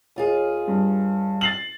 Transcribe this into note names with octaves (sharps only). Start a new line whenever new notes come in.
D#2 F4 G#4
G2
A6 C7 F#7